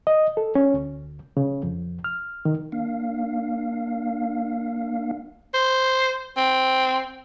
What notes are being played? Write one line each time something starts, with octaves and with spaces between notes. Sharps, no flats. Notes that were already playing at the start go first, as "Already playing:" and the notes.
D#5
A4
C#4
D2
C#3
F2
F6
D#3
A#3 D4 F5
C5
C4